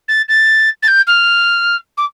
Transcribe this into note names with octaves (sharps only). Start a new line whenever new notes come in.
A6
A6
A6
G6
F6
D6